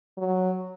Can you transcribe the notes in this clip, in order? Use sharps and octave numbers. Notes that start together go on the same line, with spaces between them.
F#3